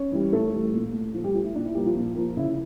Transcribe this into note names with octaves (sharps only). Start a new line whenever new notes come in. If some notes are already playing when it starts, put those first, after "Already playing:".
Already playing: C#4 C#5
E3 G3
A2 A3 A4
E3 G3
A#2
A3
A#2 F3 F4
G3 G4
F3 A3 F4
E4
A#2 D4
E4
F3 G3 A#3 G4
F3 F4
A#2
F3 A#3
C#3 E4